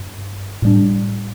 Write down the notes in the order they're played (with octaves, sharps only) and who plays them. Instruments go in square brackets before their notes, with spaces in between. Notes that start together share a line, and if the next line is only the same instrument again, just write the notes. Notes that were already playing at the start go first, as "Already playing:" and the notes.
Already playing: [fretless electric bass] G2
A2 G3 D4